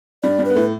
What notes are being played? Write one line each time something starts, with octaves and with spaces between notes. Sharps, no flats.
G2 G3 D5
G2 G3
B4
B3
A2 A3